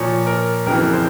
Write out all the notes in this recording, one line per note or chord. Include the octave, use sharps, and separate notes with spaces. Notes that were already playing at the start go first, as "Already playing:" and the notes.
Already playing: A#2 F3 C#5
A#4
F2 C#3 E3 A#4
C5